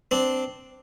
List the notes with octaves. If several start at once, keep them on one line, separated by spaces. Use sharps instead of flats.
C4 D4